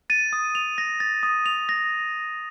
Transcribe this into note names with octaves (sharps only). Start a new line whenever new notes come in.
A6 D#7
D#6
F7
A#6
A6
D#6
F7
A#6